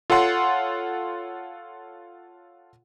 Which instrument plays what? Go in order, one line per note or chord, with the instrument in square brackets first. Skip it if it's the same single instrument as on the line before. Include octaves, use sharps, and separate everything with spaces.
[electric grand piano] F4 A4 C#5 F#5 C6